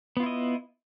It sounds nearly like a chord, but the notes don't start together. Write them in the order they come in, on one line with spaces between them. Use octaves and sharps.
B3 F4 E4 D#5